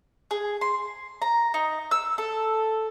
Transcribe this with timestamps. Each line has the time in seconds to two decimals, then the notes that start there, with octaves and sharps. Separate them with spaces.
0.31 G#4
0.61 C6
1.22 A#5
1.54 D#4
1.91 E6
2.18 A4